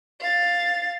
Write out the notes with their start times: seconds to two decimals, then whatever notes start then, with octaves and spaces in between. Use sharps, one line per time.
0.20 F5 A6